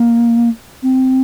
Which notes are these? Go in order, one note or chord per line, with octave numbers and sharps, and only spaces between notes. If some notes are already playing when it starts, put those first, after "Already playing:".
Already playing: A#3
C4